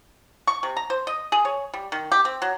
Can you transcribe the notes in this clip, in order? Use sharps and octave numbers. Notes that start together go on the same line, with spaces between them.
C#6
C3
A#5
C5
D#5
G#4
C#5
G3
D#3
G4
C4
F#3